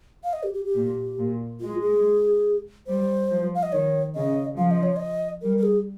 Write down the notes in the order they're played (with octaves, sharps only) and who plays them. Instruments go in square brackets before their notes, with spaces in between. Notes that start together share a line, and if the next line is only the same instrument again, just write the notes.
[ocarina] F5
D#5
G4
G4
G4
[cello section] A#2
A#2
[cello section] G#3 [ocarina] F4
[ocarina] G#4
[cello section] G3 [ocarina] C5
[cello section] F3
[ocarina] F5
D#5
[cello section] D#3 [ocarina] C#5
[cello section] C#3 [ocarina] D#5
[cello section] F3 [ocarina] F5
[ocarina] D#5
C#5
D#5
[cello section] G3 [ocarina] A#4
[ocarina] A#4
G#4